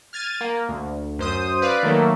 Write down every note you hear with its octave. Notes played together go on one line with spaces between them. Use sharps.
F6 G#6 A6 D#7
A#3
D2
F#2 C5 D#6
B4 D5 F5
D#3 F#3 A3 A#3